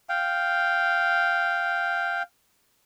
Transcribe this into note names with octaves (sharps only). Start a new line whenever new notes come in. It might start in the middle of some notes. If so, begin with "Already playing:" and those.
F5 G5